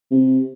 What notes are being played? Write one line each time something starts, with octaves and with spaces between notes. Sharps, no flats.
C3